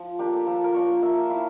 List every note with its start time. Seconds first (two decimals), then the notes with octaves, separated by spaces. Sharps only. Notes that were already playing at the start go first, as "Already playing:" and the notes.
Already playing: F3
0.19 A#3 D4 F4 G4
0.33 A4
0.47 F3 A4
0.64 A#4
0.74 A#3 D4 F4 C#5
1.02 A#3 E5
1.30 E4 F5